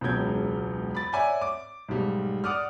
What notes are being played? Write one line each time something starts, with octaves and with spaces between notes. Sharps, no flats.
E1 C#2 B2 F#3 G6 G#6
B5 A6
C#5 D5 E5 F#5 G#5
D6
B1 G#2 G3
D5 F#5 D6 D#6 F6